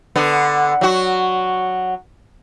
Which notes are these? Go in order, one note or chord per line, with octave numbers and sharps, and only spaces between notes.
D3 B3
F#3 F#4